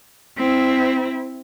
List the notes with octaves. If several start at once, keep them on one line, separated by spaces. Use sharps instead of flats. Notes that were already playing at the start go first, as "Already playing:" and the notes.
C4 E4